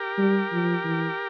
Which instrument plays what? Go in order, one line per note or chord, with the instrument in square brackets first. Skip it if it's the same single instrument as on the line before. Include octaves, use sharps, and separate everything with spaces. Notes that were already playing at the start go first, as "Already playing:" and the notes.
Already playing: [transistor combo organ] G4 A#4
[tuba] G3
F3
E3